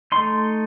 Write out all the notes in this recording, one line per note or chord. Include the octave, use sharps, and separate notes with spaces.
A3 D#4 C6